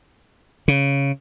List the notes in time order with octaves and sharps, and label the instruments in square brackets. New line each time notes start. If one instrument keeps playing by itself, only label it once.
[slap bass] C#3